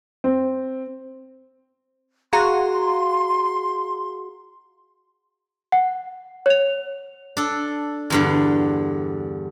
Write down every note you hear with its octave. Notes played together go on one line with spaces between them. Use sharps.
C4
F#4 G#4 F5 A#5 C6
F#5
C#5 F7
D4 A4
E2 G2 D3